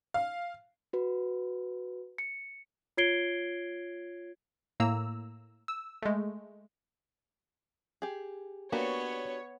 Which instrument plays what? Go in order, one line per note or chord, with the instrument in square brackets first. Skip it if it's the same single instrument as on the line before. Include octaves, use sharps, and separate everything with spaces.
[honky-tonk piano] F5
[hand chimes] F#4 B4
C#7
[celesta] F4 C#5 G#6 C7 D7 G7
[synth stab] A2 A#3 A#5 E6
E6
G#3 A3
[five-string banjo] G4 G#4
[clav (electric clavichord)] A#3 [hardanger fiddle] B3 [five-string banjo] D4 F#4 G4 [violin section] C#5